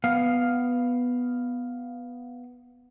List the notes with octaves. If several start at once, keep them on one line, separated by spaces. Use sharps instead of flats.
B3 F5